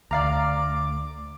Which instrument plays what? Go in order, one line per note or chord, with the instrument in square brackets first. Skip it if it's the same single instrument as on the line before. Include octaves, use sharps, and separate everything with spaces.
[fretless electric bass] D2 [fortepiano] D5 F5 A#5 [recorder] D6